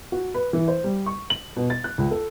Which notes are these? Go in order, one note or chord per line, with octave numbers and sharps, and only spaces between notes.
F#4
B4
E3
C5
G3
C#6
F#7
B2
A6
F#6
C#2
A4